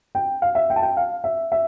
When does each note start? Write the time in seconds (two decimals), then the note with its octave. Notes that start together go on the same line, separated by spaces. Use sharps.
0.15 G5
0.42 F5
0.55 E5
0.70 G5
0.76 A5
0.82 G5
0.97 F5
1.24 E5
1.52 E5